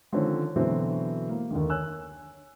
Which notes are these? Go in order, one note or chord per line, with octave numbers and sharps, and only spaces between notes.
D3 D#3 F3 C4 C#4
B2 D3 E3 F#3 C4
A#3
D#2 D3 D#3
C#5 G#5 E6 F#6